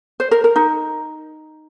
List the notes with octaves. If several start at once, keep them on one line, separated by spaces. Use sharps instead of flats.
C5
A#4
A#4
D#4